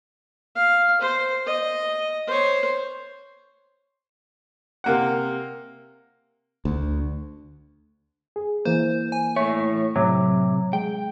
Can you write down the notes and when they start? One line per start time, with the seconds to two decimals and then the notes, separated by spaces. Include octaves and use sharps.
0.55 F5
1.01 C5
1.46 D#5
2.27 C5 C#5
4.84 C3 A#3 F#5
6.65 D2
8.36 G#4
8.65 E3 A#3 C5
9.12 G#5
9.36 A2 A3 C#5
9.96 A2 C3 F#3 E5 D6
10.73 G#3 G5